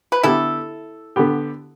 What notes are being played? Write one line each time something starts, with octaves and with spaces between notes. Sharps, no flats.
B4
D3 B3 E4 G4 A4
D3 B3 G4